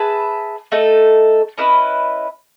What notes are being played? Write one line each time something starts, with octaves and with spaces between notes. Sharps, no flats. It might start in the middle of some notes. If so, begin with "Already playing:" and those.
Already playing: G#4 B4 E5 A5
A3 D#4 A4
C#4 E4 B4 D#5